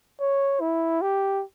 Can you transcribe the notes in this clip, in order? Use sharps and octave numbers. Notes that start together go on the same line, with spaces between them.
C#5
E4
G4